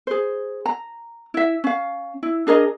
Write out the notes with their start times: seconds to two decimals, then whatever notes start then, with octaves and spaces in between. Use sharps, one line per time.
0.07 G#4 C5
0.66 A#5
1.34 E4 E5
1.64 C#4 F5
2.23 E4
2.47 D4 G#4 A#4 D#5